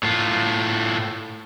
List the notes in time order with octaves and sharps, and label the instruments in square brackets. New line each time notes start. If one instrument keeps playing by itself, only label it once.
[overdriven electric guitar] A2 F4